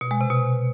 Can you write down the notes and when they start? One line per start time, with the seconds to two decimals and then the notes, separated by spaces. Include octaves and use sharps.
0.01 B2
0.11 G#3
0.21 C3
0.30 B2